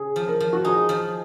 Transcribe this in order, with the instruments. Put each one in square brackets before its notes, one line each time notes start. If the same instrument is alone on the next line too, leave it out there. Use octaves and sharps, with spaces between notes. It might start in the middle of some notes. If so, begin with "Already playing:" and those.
Already playing: [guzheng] C#3 [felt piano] G#4
[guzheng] F3
[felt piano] A#4
[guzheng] F3
[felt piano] F#4
[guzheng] D#4 [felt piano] G#4
[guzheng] F3